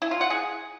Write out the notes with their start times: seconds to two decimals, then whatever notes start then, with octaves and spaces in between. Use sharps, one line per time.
0.02 E4
0.11 F4
0.21 F#5
0.30 G#4